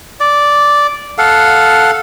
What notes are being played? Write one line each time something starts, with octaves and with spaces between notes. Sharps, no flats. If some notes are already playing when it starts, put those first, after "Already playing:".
D5
A4 F5 F#5